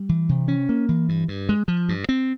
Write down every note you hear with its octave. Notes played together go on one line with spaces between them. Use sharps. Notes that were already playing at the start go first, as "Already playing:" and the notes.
Already playing: G3
E3
C3
C#4
A#3
E3
G2
G2
G#3
F3
G2
C4